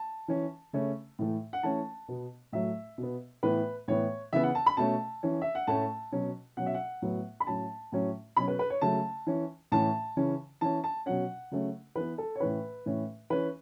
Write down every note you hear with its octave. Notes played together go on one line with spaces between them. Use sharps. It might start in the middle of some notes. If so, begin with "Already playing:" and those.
Already playing: A5
E3 C#4
C#3 A3 C#4
A2 E3 A3
F#5
E3 A3 C#4 A5
B2 B3
A2 F#3 A3 E5
B2 B3
A2 E3 B3 B4
A2 E3 B3 C#5
C#3 E3 B3 E5
F#5
A5
B5
B2 A3 C#4 A5
E3 C#4
E5
F#5
A2 A3 C#4 A5
B2 F#3 C#4
B2 F#3 C#4 F#5
E5
F#5
A2 F#3 B3
B5
A2 F#3 C#4 A5
A2 F#3 C#4
B2 F#3 C#4 B5
B4
B4
C#5
C#3 F#3 A3 C#4 A5
E3 C#4
A2 E3 C#4 A5
C#3 E3 C#4
E3 C#4 A5
A5
B2 F#3 C#4 F#5
C#3 F#3 A3 C#4
E3 B3 B4
A4
C#5
A2 E3 C#4 B4
A2 E3 C#4
E3 C#4 B4